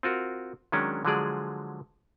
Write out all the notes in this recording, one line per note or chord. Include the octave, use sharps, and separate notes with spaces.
C4 F4 F#4 A#4
D#3 F#3 G#3 C#4 D4
D3 F3 F#3 G#3 G#4 D5